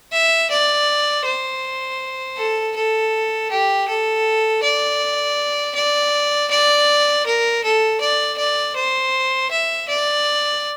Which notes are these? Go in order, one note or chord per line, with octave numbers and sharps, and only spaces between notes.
E5
D5
C5
A4
A4
G4
A4
D5
D5
D5
A#4
A4
D5
D5
C5
E5
D5